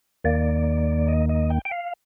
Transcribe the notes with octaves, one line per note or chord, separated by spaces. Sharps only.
D#2 D#3 A#3 D5
D#5
D#5
G5
G5
F5